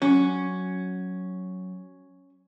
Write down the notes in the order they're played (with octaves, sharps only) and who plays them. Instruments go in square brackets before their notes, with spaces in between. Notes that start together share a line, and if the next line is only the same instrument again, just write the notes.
[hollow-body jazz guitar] F#3 [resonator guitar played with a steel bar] C#4